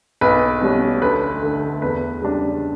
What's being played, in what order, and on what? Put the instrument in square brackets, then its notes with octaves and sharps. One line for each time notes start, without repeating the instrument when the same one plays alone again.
[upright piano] B1 B4
B2 G3 C#4
D2 B4
D3 A3
E2 B4
C#3 G3 D4